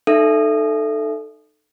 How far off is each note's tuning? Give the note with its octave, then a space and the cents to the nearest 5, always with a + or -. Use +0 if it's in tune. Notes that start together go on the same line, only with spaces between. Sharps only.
D#4 -30 A4 +0 E5 +25